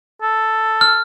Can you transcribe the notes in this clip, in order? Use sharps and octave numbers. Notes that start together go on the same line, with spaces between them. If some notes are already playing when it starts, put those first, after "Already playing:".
A4
F6